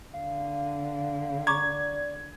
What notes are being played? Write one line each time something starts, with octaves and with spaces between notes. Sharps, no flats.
D3 F5
D5 A#5 C#6 D6 G#6